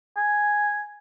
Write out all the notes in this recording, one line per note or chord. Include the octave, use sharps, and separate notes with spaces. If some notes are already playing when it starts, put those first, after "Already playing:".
G#5